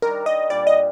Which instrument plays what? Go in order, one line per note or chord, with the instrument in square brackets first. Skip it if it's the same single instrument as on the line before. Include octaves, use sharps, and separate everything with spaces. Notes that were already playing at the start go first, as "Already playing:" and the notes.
[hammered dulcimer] D#3 G3 D4 [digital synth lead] A#4
[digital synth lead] D#5
[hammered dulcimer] A#2 G3 D4 [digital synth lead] D5
[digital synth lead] D#5